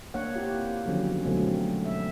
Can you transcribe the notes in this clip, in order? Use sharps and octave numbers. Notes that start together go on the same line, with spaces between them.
A#3 D4 C#5 F#5
C4 E4 F4 G4
D3 D#3 F3 F#3 B3 C#4
B2 D3 F#3 G#3 A3 C4
E5